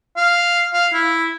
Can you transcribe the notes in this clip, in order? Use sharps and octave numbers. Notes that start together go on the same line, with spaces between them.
F5
F5
E4